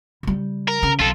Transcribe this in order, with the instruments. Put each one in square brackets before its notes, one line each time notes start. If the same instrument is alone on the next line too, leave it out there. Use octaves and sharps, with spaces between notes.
[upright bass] C#3 G3
[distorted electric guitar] A#4
[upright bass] C#3
[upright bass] B1 [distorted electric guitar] F4 A4